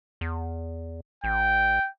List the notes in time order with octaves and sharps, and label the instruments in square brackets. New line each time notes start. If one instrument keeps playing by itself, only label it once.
[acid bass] E2
[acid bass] A1 [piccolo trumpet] G5